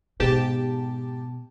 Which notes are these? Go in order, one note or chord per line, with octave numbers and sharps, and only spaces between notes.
G#2 B2 G4 A5